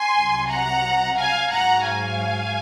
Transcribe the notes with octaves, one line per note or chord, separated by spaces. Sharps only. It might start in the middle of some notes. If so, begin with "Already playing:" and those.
Already playing: G#5 C6
C2 C3 F#3
F#5 A#5
F5 G#5
G#2 F#3 F#5 A#5
F5 G#5